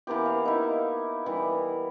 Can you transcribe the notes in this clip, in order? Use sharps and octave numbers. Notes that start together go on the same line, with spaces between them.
E3 A#3 B3 G4
F5
D#4 E4
E3 G3